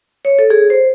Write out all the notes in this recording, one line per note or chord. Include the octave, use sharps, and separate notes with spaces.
C#5
A4
G#4
C5